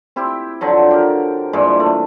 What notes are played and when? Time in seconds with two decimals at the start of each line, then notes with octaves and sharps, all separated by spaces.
0.16 C4 E4 G4
0.61 D3 F3 F#3
0.91 G4 A#4
1.53 G2 A#2 E3 G#3
1.80 A3